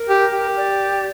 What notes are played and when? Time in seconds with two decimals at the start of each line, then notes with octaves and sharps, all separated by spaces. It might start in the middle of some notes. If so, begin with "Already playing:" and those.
Already playing: A#4
0.09 G4
0.33 G4
0.57 D5